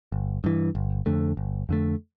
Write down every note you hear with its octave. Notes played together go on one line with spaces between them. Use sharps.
G1
G2 E3
G1
F2 D3 A3
G1
F2 D3 A3